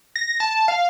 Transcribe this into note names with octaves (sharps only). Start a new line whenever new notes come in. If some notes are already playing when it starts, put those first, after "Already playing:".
A#6
A5
F5